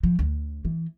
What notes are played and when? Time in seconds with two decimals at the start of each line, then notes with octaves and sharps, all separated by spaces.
0.03 F3
0.19 D2
0.65 E3